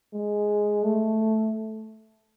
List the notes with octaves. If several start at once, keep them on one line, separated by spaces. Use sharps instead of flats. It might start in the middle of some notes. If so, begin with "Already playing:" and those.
G#3
A3